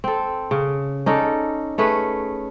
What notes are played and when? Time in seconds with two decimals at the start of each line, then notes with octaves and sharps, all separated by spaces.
0.04 C4 A4
0.51 C#3
1.06 C#4 D#4 A4 D5
1.78 A3 C#4 G#4 B4